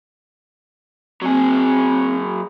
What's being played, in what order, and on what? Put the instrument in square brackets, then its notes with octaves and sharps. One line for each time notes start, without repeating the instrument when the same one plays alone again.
[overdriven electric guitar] F#3 G#4 [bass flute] C4